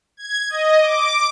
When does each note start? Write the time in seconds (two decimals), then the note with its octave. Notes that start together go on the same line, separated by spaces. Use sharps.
0.17 G#6
0.50 D#5
0.80 D6